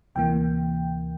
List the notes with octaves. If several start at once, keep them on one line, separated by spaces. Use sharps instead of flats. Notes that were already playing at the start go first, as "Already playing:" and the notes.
D2 C3 E3 A#3 G5